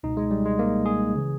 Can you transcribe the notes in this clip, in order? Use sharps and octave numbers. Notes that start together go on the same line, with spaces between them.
C#2 B2 D#4
G#3
G3
G#3
A#3
G#4
C#3 E3